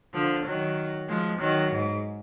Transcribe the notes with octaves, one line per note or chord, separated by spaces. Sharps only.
D3 F3
D#3 F#3
F3 G#3
D#3 F#3
G#2